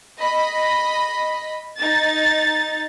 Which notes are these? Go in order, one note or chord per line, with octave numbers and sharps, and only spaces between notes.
D#5 B5
D#4 A6